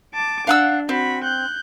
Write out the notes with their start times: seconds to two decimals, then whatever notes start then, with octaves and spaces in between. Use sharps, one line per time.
0.15 A5 D6
0.47 D4 F5 F#5 E6
0.89 C4 F#4 B5
1.24 F#6 G6